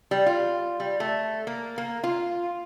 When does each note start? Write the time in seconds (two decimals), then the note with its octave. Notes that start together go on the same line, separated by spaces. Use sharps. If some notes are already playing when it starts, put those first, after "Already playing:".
0.11 G3
0.26 F4
0.80 G3
1.00 A3
1.47 A#3
1.78 A#3
2.04 F4